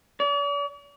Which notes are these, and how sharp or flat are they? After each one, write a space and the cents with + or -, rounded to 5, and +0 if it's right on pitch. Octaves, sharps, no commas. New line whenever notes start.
D5 -45